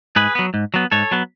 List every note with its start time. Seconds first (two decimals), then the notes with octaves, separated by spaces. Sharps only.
0.16 G#2 G#4 B4
0.35 F#3 B3
0.54 G#2
0.74 F#3 B3
0.92 G#2 A4 C#5
1.11 F#3 B3